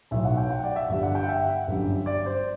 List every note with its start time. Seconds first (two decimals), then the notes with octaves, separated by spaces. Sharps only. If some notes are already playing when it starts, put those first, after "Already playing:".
0.11 B1 A2 F#3 E5
0.25 F#5
0.38 G5
0.51 F#5
0.64 D5
0.76 E5
0.89 G1 G2 D3 G3 E5
1.03 F#5
1.15 G5
1.23 F#5
1.29 E5
1.67 G1 F#2 D3 G3
2.06 D5
2.26 C5